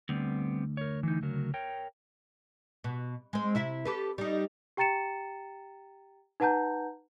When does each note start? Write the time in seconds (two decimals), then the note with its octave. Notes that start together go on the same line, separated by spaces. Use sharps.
0.09 D2 G3 B3 C4
0.77 A#4 C#5
1.03 E3 D#4
1.22 C#3 F#3 A#4
1.54 A#4 C#5 G5
2.84 B2
3.33 G#3 C4
3.55 C3 E4 E5
3.85 G4 A4 B4
4.18 G3 D#4
4.77 G4 G5 A#5 A6 C#7 E7
6.40 D#4 B4 F#5 A5 A#5 G6